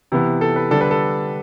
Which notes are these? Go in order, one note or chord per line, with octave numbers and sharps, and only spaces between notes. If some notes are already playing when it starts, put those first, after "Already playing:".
C3 E3 B3 E4
A4
B4
D3 G3 D4 A4
B4
A4